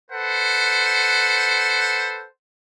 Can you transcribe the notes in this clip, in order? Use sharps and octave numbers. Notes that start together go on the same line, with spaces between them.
A4 B4 C5 F#5